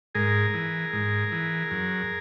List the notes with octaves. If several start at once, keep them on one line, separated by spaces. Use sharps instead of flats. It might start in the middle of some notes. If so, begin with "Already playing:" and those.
G#2 G#4 A#4
E3
G#2
E3
F#2